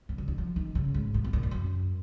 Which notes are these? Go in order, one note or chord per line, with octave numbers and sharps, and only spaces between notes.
B2
C#3
D#3
F3
D#3
C#3
G#2
A#2
B2
A#2
G#2
F#2